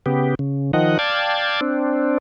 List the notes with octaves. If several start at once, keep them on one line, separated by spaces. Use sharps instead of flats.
C#3 B3 G4
C#3
D#3 F3 D#5 F#5
D5 F5 G5 A5 G#6
C4 D4